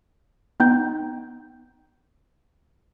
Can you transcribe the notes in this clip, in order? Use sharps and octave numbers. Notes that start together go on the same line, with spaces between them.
B3 D#4 G5 G6